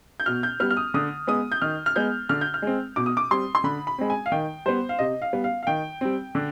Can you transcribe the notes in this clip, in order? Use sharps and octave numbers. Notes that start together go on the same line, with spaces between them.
G6
B2 F6
G6
G3 B3 F6
F6
D#6
D3 D#6
G#3 B3 D#6
G6
D#3 F6
F6
G#3 B3 G6
D3 F6
G6
F6
G#3 C4
B2 D6
D#6
D6
G3 C4 C6
C6
D3 B5
B5
G#3 C4
G#5
F5
D#3 G5
G3 B3 C5
F5
C3 D#5
F5
G3 B3
F5
F5
D#3 G5
G3 C4
D3